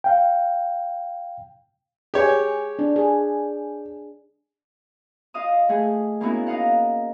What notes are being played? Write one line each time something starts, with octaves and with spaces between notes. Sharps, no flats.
F5 G5
G4 G#4 C#5
D4
G#4
F4 D#5 F5 D#6
A3 G#4
A#3 B3 C#4 D#4 E4 F#4
D#4 D#5 F5 F#5